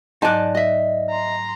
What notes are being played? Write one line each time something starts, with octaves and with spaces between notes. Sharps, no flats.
G#2 F#3 D#4 D5 G#5 A5 F#6
D#5 E5
A#5 C6